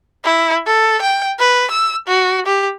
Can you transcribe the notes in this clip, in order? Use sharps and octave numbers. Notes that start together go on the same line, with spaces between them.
E4
A4
G5
B4
E6
F#4
G4